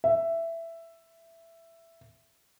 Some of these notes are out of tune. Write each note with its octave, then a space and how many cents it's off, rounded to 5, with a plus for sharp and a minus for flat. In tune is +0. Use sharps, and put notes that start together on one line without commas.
E5 +10